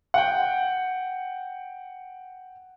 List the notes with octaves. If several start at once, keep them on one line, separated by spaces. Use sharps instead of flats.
F#5 G5